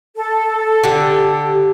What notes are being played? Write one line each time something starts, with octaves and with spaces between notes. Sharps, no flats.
A4
D3 G4